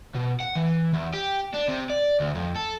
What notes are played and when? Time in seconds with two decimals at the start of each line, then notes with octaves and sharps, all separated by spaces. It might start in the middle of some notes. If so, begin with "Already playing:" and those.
0.15 B2
0.41 F#5
0.57 E3
0.94 E2
1.14 G4
1.54 D4
1.68 C3
1.90 D5
2.20 D2
2.35 F2
2.56 A4